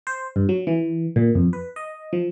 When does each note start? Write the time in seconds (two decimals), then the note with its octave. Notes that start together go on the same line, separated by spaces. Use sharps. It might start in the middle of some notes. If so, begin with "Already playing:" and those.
0.07 C5
0.36 G2
0.49 F#3
0.67 E3
1.16 A#2
1.35 F2
1.53 B4
1.76 D#5
2.13 F3